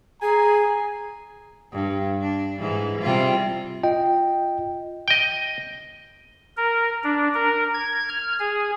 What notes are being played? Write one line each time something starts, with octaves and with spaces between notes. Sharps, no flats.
G#4 G#5 A#5
G2
D4
G#2 E3
C3 G3 F4
F4 D#5 G5
D#5 G5
A#4
D4
A#4
G#6
F6
G#4